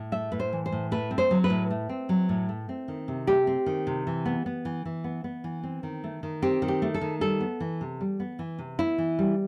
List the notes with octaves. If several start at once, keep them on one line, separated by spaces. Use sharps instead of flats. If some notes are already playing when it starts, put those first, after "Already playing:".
Already playing: A2
A3 E5
A2 B4
C5
E3
C5
A2
A3 B4
C4
C5
F#3
B4
A2
A3
C4
F#3
A2
A3
C4
D#3
C3
A3 G4
C4
D#3
C3
E3
B3
B3
E3
E3
B3
B3
E3
C4
D#3
A3
D#3
C4 G4
D#3
G4
A3
A4
D#3
G3 A4
B3
E3
C3
G3
B3
E3
C3
B3 E4
E3
G3